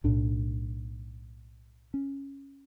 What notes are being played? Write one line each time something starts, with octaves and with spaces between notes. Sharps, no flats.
B1 A2 D4
C#4